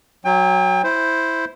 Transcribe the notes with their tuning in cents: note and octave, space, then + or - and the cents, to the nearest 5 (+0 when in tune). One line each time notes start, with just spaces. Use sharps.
F#3 +0 G5 +35
E4 +0 C5 +0